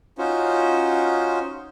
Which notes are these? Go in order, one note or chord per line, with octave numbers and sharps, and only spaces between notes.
C#4 D#4 F4 F#4 C5